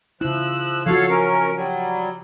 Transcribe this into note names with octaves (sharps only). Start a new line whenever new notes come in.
C#3 F3 E4 E6 F#6
F3 F4 F#4 A4 C#5 F5
C#4 A#4
F#3 G3